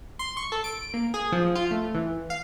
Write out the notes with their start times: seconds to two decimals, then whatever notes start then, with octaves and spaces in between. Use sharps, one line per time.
0.19 C6
0.37 C#6
0.52 A4
0.64 D7
0.94 A#3
1.14 G#4
1.32 F3
1.55 F4
1.71 A3
1.94 E3
2.30 F5